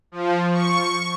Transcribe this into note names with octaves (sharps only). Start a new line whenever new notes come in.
F3
C#6